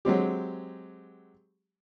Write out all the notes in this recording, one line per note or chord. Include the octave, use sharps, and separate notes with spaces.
F#3 G#3 C4 G4